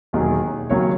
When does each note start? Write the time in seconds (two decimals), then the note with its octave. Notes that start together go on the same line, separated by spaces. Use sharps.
0.13 E1 D#2 D#3 F#3 G#4
0.69 D#2 C#3 F#3 C#5